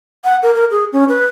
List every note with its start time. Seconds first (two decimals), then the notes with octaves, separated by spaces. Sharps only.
0.24 F#5
0.43 A#4
0.55 A#4
0.71 G#4
0.93 C#4
1.09 B4